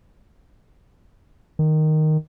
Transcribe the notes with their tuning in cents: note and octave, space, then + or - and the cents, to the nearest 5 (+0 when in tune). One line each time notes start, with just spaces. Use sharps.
D#3 -5